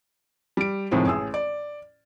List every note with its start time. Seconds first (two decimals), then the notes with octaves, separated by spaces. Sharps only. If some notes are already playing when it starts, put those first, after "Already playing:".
0.57 G3 D7
0.91 A2 C3 D#3 F3 G#3 C4
1.06 A1 G#4 E6
1.34 D5